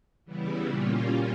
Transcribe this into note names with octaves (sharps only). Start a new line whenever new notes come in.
C#3 E3 G3 B3 E4
A#2 G3 A#3 C#4 F4